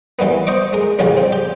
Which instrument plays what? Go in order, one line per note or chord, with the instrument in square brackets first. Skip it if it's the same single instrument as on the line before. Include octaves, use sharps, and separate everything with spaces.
[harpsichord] E3 G3 A#3 B3
C5 D#5 C#6 D6
G#3 A#4
F2 A2 C#3 F3 G3 C#4
C4
G4